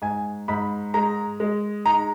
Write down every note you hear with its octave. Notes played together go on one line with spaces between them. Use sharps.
G#2 G#5
G#2 B5
G#3 A#5
G#3
D#4 A#5